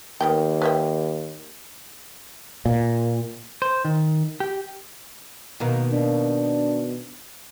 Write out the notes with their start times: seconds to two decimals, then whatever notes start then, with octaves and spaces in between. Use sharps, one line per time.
0.21 D#2 D#3 B3 G5
0.62 B4 E5 G5
2.66 A#2
3.62 C5
3.85 D#3
4.40 G4
5.60 B2 D#3 A#3
5.93 D4